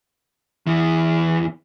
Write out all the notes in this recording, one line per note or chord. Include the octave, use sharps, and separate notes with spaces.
E2 E3